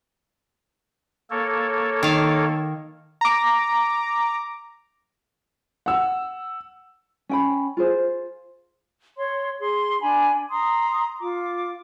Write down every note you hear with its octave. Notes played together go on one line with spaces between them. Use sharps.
A#3 A4 C#5
D#3 F5
A#5 D6
F#5 E6
C#4 G5 B5
F4 G#4 C5
C#5 C6
G#4 C6
D4 G#5 B5
A#5 C6 D#6
F4 D6